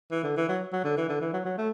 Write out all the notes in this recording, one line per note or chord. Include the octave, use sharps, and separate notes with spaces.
E3
D3
E3
F#3
F#3
D3
E3
D3
E3
F#3
F#3
A3